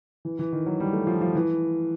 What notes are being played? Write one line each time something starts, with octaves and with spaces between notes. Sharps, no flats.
E3
E3
D#3
F#3
G3
A3
F3
F3
E3